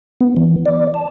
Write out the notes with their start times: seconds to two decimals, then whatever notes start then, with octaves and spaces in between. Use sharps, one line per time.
0.21 B3
0.37 E3
0.66 D5
0.94 A5